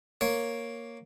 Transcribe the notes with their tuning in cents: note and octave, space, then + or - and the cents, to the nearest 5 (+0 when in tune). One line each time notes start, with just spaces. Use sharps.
A#3 +0 C#5 +0